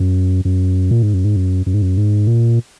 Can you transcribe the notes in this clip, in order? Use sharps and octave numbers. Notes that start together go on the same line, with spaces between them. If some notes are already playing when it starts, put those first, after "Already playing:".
Already playing: F#2
F#2
A#2
G#2
F#2
G#2
F#2
F#2
G#2
F#2
G#2
A#2